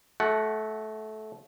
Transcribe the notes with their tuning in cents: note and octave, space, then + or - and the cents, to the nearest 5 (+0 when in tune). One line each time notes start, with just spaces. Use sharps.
A3 -20 F#4 +10 F#5 +0